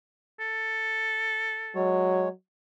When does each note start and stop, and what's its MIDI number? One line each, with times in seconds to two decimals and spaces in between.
0.40 1.99 69
1.75 2.31 54
1.75 2.29 56
1.75 2.29 73